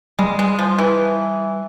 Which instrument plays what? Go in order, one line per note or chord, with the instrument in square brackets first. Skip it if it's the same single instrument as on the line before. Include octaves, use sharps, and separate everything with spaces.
[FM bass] G3 [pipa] G#3
[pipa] G#3
F3
E3